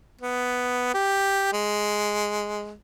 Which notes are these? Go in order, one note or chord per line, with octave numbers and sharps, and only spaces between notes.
B3
G4
G#3